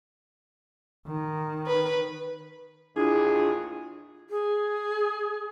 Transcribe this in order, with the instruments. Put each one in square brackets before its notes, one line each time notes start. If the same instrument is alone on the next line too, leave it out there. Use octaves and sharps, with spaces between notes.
[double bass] D#3
[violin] B4
[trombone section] A1 D#2 G#4 [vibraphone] D4 E4 F4
[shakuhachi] G#4